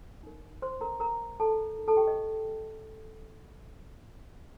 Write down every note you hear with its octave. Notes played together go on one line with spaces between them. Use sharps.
D#4 A#4
C5 C6
A#4 A#5
A#4 A#5
A4 A5
D#4 A#4
A4 A5
G4 G5
D#5